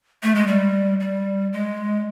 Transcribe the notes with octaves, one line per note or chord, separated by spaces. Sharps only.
A3
G#3
G3
G3
G#3